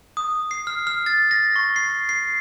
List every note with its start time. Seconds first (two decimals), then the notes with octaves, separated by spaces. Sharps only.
0.17 D#6
0.51 C7
0.67 F6
0.87 F6
1.06 A6
1.31 A#6
1.56 C#6
1.76 C7
2.09 C7